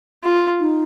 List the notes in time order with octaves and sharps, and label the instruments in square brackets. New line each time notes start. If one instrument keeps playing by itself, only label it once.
[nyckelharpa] F4
[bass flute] D#4